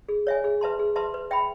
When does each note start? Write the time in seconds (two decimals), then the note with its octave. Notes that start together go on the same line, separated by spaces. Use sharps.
0.09 G#4
0.27 C#5 E5 G#5
0.44 G#4
0.61 B4 E5 A5 C6
0.79 G#4
0.96 B4 E5 A5 C6
1.14 B4
1.31 E5 G5 B5